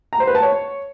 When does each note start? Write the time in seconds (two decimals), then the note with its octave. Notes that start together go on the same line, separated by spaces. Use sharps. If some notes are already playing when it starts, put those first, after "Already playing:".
0.13 A#5
0.20 C5
0.27 B4
0.35 A5
0.42 C#5